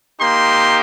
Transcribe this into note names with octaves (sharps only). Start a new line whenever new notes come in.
A#3 D#4 G4 C6